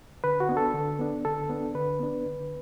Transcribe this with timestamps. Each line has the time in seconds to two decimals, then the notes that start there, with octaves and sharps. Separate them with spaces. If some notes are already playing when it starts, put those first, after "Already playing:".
0.24 D3 B4
0.40 F#4
0.49 B3 D4
0.57 A4
0.74 D3
0.99 B3 D4
1.25 D3 A4
1.50 B3 D4
1.75 D3 B4
2.00 B3 D4
2.26 D3